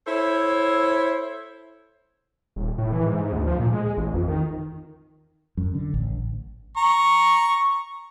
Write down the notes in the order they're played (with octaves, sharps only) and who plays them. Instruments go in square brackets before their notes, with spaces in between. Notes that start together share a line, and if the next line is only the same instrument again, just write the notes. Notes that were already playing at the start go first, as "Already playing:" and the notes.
[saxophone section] E4 A4 C5 C#5 E5
[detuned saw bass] D#1
A2
E3
G#2
D2
F3
A#2
G#3
A1
F2
D#3
[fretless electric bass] F#2
D3
A1
[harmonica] A#5 C#6